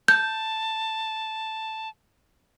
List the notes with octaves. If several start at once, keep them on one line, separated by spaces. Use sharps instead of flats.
A5 G6